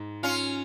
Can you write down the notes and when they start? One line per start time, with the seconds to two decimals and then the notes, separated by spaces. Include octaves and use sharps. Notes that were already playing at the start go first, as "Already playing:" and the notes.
Already playing: G#2
0.23 C#4 F4